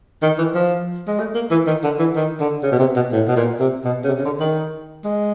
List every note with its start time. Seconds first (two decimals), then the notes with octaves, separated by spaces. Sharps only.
0.22 D#3
0.38 E3
0.54 F3
1.07 G#3
1.19 A3
1.34 A#3
1.51 E3
1.66 D#3
1.83 D3
1.99 E3
2.16 D#3
2.40 D3
2.63 C#3
2.72 B2
2.79 C3
2.96 B2
3.12 A2
3.27 B2
3.36 A#2
3.59 C3
3.84 B2
4.04 C#3
4.08 C3
4.19 C#3
4.25 D3
4.40 D#3
5.04 G#3